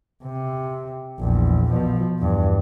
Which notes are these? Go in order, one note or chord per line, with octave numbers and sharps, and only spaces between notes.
C3
A#1 E2
B2 F3
E2 G2